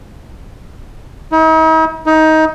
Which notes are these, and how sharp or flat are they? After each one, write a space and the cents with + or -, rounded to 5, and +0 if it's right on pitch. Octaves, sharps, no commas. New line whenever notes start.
D#4 +45
D#4 +20